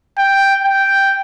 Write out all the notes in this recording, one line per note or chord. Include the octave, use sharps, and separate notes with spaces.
G5
G5